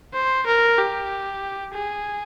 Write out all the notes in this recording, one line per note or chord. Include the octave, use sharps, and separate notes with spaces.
C5
A#4
G4
G#4